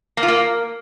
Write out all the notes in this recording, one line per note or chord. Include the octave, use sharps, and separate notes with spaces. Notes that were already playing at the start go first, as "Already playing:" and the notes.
A#3
F4
A#3